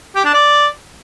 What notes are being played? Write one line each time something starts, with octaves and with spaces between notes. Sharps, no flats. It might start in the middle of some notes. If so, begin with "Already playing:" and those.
G4
D4
D5